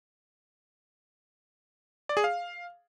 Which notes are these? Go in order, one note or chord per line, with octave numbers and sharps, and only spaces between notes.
D5
G#4
F5